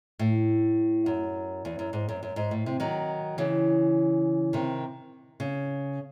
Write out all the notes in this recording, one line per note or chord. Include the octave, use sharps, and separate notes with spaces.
A2
F#2
E2
F#2
G#2
F#2
F#2
G#2
A2
C3
D#3 F#3
C#3 E3
C3 D#3
C#3